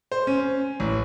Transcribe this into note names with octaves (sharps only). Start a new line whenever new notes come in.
C5
C#4
A1